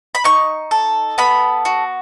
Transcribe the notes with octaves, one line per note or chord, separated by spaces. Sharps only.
B5
D#4 C#6
A4
B3 B5
F#4